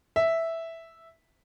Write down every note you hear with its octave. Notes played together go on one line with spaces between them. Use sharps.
E5